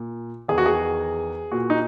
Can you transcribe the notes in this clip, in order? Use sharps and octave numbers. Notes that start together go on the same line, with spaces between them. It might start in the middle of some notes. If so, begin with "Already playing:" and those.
Already playing: A#2
E2 D#3 G#4
F#4
G#4
A#2 F#4
D#4